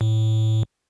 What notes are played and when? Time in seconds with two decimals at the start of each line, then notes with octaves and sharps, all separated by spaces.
0.01 A2